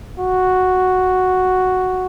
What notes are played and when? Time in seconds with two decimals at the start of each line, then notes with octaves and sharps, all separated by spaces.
0.20 F#4